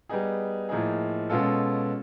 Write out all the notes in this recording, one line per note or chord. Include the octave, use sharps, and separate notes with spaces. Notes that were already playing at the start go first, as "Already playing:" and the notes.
G3 B3 D#4 G#4
A2 F3 A#3 D#4 G#4
B2 G#3 C#4 F4 A4